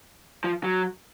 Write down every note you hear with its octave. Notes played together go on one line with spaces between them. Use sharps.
F3
F#3